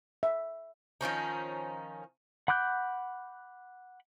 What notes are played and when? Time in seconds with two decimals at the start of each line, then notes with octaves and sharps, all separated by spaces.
0.23 E5
1.01 D#3 F3 C#4 D#4
2.48 F#5 B5 D6 F#6 G6